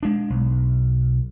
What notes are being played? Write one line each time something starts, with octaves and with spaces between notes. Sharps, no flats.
G#3 D4
B1